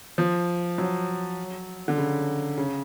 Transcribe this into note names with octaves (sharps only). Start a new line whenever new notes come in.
F3
F#3
D3
C#3
C#3